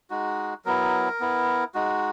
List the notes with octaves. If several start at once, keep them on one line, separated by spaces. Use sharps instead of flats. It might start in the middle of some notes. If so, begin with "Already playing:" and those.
G#3 D#4 F#4
F#3 B3 E4 A#4
B3 E4
G#3 D#4 F#4